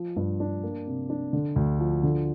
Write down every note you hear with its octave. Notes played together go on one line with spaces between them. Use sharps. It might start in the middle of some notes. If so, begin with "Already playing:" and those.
Already playing: F3
G2
D4
A#3
C3
D4
D3
D2
F3
D3